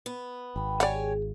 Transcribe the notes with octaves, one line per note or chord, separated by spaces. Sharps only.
B3
G#1 G5 B5
G4 C#5 D5 F#5 G#5
G#4